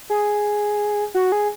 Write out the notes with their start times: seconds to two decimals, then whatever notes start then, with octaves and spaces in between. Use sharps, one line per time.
0.10 G#4
1.14 F#4
1.32 G#4